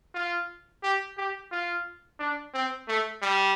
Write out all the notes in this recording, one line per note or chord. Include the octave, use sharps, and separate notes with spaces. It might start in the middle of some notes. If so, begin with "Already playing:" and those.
F4
G4
G4
F4
D4
C4
A3
G3